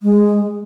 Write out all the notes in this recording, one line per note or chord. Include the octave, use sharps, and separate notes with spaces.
G#3